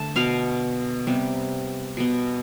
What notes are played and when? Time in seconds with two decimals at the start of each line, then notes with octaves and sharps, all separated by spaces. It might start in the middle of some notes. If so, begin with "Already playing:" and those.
Already playing: D3 A3 A5
0.16 B2 B3 F5
1.07 C3 G3 B3
1.97 B2 B3